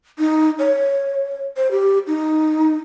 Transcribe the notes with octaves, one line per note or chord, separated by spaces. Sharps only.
D#4
C#5
C5
G4
D#4